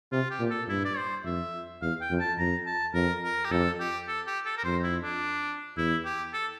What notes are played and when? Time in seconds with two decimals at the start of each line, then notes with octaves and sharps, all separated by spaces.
0.12 C3 F4
0.31 G4
0.40 A#2
0.50 A4
0.68 G2 E4
0.85 D5
0.97 C5
1.25 F2 E5
1.82 E2 F5
2.01 G5
2.10 F2
2.20 A5
2.38 F2 A#5
2.67 A5
2.94 F2 A#4
3.23 A#4
3.45 G4
3.51 F2 A4
3.80 G4
4.08 A4
4.27 G4
4.46 A4
4.57 A#4
4.65 F2 C5
4.83 E4
5.02 D4
5.77 E2 E4
6.05 G4
6.34 A4